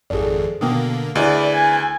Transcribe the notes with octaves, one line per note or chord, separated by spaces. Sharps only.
G#1 F2 G#4 A4 D5
B2 D3 A#3 G5 D#6
D2 E4 G#4 B4 D5 D#5
G#5